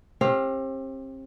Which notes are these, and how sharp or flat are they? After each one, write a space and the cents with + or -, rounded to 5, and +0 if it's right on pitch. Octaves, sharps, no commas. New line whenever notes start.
C4 +40 G4 +20 F5 +0